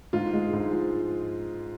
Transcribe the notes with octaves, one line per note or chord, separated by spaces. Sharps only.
G#2 F4
G#3
G#2
F3